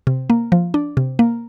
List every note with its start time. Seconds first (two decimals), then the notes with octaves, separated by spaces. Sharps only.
0.07 C3
0.30 A#3
0.52 F3
0.74 D4
0.97 C3
1.19 A#3